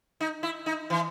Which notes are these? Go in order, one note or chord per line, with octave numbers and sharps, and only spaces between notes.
D#4
E4
D#4
E3